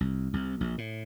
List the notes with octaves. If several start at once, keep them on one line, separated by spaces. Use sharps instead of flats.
C2
C2
A#1
A2